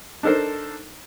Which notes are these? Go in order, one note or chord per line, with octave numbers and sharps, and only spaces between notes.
D4 D#4 A4 A#4 C5